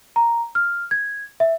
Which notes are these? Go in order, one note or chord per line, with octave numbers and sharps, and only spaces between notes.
A#5
F6
G#6
E5